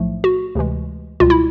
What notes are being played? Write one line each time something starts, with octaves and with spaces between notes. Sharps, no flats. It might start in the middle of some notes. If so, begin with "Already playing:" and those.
Already playing: B1 A2 F3 A3
F#4
D2 C3 E3 G#3
C#2 B2 G3 F4
E4